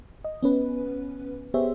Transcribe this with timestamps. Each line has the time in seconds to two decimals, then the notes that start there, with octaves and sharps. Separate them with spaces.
0.25 D#5
0.43 B3 C#4 B4
1.54 B3 G4 G#4 C5 C#5 E5